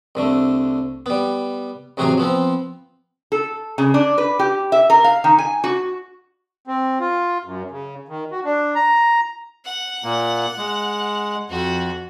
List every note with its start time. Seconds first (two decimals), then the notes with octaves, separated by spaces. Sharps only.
0.15 C2 D3 A3
1.06 G3 B3
1.97 A1 C3 F#3 F#4 G#4 D#6
2.18 F3 B3 C4
3.32 A4
3.78 C#3
3.94 D4
4.18 B4
4.39 G4
4.72 E5
4.90 A#4
5.04 F5
5.24 D#3
5.38 G#5
5.64 F#4
6.67 C4
7.00 F4
7.45 F#2
7.71 C#3
8.08 D#3
8.31 F#4
8.45 D4
8.75 A#5
9.65 F#5
10.04 A#2 A#3
10.58 G#3
11.50 F2 F#4